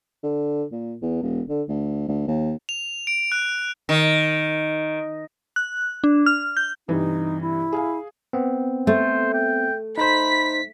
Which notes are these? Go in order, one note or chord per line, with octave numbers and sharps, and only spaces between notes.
D3
A#2
E2
E1
D3
D2
D2
D#2
F7
D7
F#6
D#3
F#6
D4
F6
G6
G2 C3 E3 D#4
E4
G#4 F5 G#5
B3 C4
A3 C5
G5
D#4 C5 B5 B6